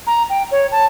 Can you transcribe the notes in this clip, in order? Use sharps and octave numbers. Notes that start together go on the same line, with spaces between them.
A#5
G5
C#5
A5